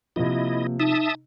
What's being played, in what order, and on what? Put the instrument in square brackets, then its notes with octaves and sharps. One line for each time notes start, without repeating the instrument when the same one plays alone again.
[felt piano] C3 F3 [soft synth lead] A#3 [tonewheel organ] E4 D#5
[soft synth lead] D#4 [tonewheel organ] E5 A5 D#6